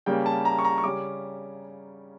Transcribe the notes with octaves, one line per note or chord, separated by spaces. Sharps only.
C#3 G3 A#3 C#4 G5
A5
A#5
C#6
A#5
C#6
C#3 G3 C#4 D6